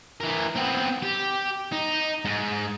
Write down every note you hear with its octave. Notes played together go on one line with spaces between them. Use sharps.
E3 A#4
B3 C4
G4
D#4
G#2